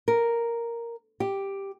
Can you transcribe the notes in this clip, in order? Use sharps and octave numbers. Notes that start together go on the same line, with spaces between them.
A#4
G4